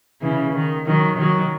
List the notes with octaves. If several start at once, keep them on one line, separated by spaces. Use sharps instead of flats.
C#3 E3
D#3
D#3 F#3
D#3 F#3